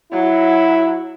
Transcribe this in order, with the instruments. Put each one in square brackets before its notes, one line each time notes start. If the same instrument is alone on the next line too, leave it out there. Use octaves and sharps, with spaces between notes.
[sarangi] F#3 [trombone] E4